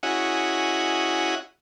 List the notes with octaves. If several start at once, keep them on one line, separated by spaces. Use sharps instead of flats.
C#4 E4 F#4 G#4 D#5 F#5